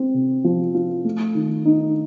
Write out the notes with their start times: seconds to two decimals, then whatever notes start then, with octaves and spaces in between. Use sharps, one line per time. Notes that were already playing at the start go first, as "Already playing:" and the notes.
Already playing: C4
0.14 C3
0.44 F3
0.75 F4
1.05 A3
1.35 D#3
1.65 D#4